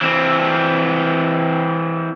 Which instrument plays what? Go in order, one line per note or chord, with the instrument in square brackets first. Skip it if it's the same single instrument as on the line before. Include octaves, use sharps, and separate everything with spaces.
[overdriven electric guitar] E3 C4